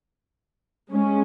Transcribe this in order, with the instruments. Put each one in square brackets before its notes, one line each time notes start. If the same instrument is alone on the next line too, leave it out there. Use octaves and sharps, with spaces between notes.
[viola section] G#3 C#4